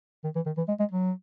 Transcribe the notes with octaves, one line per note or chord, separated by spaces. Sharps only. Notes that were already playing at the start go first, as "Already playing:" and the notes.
D#3
E3
D#3
E3
G#3
G#3
F#3